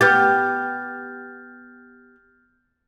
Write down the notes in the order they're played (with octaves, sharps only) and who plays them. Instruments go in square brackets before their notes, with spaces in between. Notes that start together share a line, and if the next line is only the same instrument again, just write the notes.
[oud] B3 G4 [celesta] F6 G6 A6